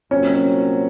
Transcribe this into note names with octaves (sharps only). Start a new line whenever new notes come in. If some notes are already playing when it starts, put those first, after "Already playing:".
C2 A#2 F#3 C4 C#4 F#4